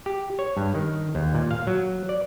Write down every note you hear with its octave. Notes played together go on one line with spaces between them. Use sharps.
G4
C#5
G2
D#3
D#2
A#2
F5
F#3
D5